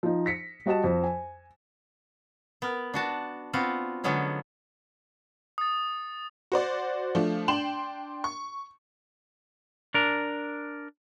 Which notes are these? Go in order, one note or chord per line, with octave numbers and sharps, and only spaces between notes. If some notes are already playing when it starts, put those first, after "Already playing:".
F3 D#4
A#6 B6 C#7
G3 F#4 D#5 A5 E7
F2
G#5
B3 A#4
D4 F#4 A5
B3 C4 F4 F#4 B4
D3 F3 F#3 G#3 B3 C#4
D#6 A6
F#4 C5 D5
F3 A3 D4
D4 G5 C6 E7 F#7
C#6
D4 A#4